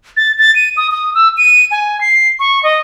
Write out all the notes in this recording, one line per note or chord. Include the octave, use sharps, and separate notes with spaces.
A6
A6
D#7
D#6
D#6
E6
D#7
G#5
C7
C#6
D#5